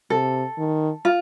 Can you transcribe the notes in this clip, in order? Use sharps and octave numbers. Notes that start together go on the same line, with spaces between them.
C3 A4
D#3
F4